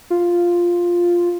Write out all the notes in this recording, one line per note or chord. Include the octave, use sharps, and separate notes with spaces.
F4